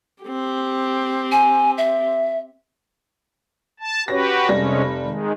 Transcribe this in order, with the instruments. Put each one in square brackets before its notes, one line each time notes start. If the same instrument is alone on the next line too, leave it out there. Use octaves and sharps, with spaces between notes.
[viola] C4 G4
[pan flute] G#5
E5
[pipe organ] A5
[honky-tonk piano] C#4 A#6 [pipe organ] F#4 G4 B4
[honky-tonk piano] F1 G3 A#6 [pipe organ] C3 G#3 C#4
[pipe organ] D#3 G#3